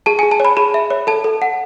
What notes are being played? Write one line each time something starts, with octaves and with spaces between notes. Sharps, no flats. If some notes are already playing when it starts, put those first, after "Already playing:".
G#4 A5
G#5
G#4
A5
C#5 B5
G#4 B5
E5
C#5
A4 A5
A4
F#5